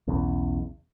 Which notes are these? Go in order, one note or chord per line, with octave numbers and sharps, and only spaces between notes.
B1 E2 C#3